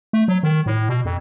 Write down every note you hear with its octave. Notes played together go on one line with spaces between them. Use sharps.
A3
F#3
D#3
A2
B2
F2